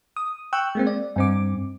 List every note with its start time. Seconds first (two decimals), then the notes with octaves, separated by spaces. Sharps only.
0.16 D#6
0.53 G5 C#6 E6 F#6 G6
0.75 G#3 A#3 C4
0.87 D5
1.16 G2 C4 D6